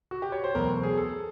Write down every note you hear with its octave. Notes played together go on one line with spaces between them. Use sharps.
F#4
G4
C#5
C5
E2 B2 F#3 A3 A#4
G#4
A4